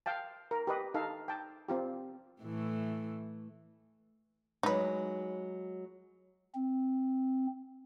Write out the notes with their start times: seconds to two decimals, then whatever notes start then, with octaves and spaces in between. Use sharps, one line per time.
0.06 F5 G5 A5
0.51 A#4
0.67 G4 B4 D#5
0.94 D#4 A4 F5
1.28 G5 A5
1.68 C4 F4 G4
2.41 A2 E3 A3
4.63 F#3 G#3 D#4 B4
6.54 C4